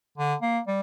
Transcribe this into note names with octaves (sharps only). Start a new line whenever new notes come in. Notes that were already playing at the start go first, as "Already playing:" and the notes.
D3
A#3
G3